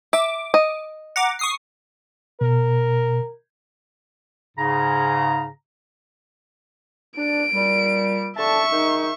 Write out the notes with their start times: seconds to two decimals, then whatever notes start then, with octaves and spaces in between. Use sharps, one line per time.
0.13 E5 D6
0.54 D#5
1.16 F#5 A#5 D6
1.39 C#6 D#6 C7
2.41 B2 A#4
4.57 G#2 C#3 A#5
7.17 D4 D7
7.54 A#2 G3
8.37 D3 E5 A5 C#6
8.72 D#3 G#3 D#4